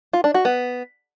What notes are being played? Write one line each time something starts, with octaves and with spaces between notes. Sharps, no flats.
F4
D4
F#4
B3